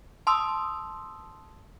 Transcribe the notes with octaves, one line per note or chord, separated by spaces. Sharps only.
A5 C6 D#6 E6